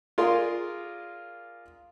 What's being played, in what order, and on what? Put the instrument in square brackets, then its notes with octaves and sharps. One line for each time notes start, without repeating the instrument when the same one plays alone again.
[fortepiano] F4 G#4 A#4 D5 F5 C6